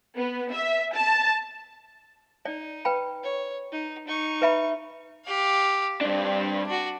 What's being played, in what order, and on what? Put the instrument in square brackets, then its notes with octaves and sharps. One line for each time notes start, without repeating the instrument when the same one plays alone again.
[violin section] B3
E5
A5
[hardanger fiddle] D#4 [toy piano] D5
[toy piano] B4 G5 B5
[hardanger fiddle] C#5
D#4
D#4 C#6
[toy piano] B4 E5 B5
[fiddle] G4 F5
[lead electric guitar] G2 D4 [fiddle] C4
[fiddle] D4 F#4